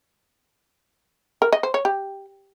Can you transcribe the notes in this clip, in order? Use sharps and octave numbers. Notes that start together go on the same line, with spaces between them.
A#4
D#5
C5
C#5
G4